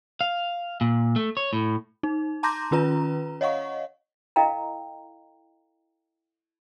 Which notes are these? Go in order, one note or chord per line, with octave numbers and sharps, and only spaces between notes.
F5
A#2
A3
C#5
A2
D#4
A5 A#5 C6 D6 G6 A#6
D#3 C#4 F4 B4 A#5
C#5 D#5 F5 F#5 C#6
E4 A4 D#5 F5 G5 A#5